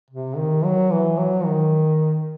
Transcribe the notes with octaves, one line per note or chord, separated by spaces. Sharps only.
C3
D#3
F#3
E3
F#3
D#3